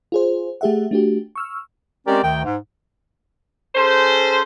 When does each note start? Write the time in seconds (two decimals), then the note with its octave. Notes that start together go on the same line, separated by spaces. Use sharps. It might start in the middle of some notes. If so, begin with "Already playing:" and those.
0.12 F4 G#4 C5
0.61 A3 G4 G#4 E5 F#5
0.91 A3 D4 F#4 G4
1.36 C#6 E6 F6
2.07 G#3 C4 C#4 G4 A#4 D5
2.24 D2 D#3 G5
2.45 G#2
3.75 C#4 G#4 A4 C5